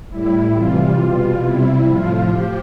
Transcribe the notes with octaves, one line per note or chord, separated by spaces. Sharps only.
A2 G3 E4
C3 E3 G3 F4
B2 G3
C3 G3 E4
A2 F3 F4
F3 G4